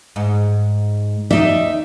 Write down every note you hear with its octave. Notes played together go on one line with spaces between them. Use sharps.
G#2
D#2 D#4 D5 E5